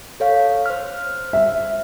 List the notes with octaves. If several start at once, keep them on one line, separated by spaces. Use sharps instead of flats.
A4 C#5 F5
C5 F6
E5